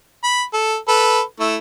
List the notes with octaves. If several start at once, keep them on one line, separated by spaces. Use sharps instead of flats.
B5
A4
A4 B4
A3 E4